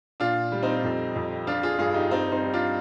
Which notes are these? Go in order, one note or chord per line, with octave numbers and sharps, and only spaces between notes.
A#2 D4 F4
G3
C4 D#4
F2
F2
F3 D4 F4
F4 G#4
G2 F4 G#4
D#4 G4
G3 C4 D#4
C4 D#4
G3
D4 F4